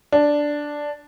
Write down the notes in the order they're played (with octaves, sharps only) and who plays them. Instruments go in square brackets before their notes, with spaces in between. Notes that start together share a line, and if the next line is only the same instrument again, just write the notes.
[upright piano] D4